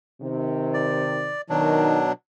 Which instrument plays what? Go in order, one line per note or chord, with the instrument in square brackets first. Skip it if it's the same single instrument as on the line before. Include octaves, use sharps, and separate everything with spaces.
[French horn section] C3 D#3
[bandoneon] D5
[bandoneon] B2 F#3 D4 [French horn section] D#3